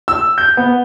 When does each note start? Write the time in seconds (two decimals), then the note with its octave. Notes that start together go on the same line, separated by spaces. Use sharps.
0.08 E6
0.38 G6
0.57 B3